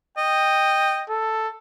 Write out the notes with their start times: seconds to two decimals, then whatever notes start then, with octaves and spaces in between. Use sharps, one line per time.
0.18 D#5 G5
1.09 A4